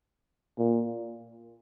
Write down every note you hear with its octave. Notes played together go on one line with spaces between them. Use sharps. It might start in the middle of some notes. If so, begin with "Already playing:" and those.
A#2